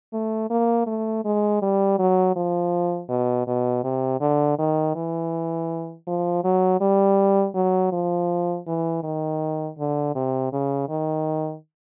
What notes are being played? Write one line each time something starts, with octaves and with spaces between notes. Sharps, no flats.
A3
A#3
A3
G#3
G3
F#3
F3
B2
B2
C3
D3
D#3
E3
F3
F#3
G3
F#3
F3
E3
D#3
D3
C3
C#3
D#3